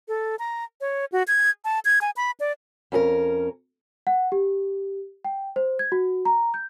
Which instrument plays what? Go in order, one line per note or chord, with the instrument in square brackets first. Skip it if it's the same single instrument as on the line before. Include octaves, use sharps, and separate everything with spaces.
[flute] A4
A#5
C#5
F#4
G#6
A5
G#6
G#5
B5
D5
[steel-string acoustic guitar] F2 C#4 G#4 A#4
[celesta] F#5
G4
G5
C5
G#6
F#4
A#5
G6